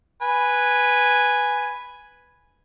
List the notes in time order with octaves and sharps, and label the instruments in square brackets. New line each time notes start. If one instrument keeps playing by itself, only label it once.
[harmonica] B4 G#5